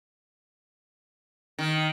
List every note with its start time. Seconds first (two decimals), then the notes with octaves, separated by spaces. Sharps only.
1.59 D#3